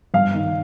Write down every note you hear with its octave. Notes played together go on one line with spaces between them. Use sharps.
G2 F5
D#3